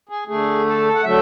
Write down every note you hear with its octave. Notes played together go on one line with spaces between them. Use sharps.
G#4
D3 A3 G#4
A4
F#5
D3 F#3 A3 E5